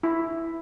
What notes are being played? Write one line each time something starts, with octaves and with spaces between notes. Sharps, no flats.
E4